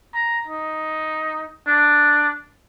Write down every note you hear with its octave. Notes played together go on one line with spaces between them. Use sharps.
A#5
D#4
D4